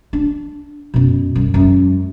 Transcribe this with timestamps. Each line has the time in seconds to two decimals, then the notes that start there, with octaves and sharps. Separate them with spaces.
0.13 D4
0.94 F#2 B2
1.35 F#2 G3
1.54 F#2 G#3